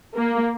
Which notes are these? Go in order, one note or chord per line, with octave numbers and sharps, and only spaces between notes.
A#3